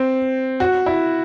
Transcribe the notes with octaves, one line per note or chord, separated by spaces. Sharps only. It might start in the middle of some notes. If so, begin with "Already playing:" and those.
Already playing: C4
F#4
E4